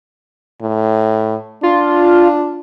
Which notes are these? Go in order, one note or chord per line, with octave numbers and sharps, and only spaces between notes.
A2
D4 F4